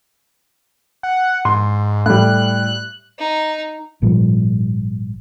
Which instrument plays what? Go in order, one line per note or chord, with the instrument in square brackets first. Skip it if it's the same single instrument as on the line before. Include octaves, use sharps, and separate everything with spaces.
[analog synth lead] F#5
[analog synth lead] G#2 [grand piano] C6
[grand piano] A2 G3 [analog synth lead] F#6
[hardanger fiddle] D#4
[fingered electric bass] G#1 A#2 F3 G3